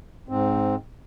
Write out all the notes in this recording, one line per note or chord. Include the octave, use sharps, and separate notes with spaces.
G#2 C4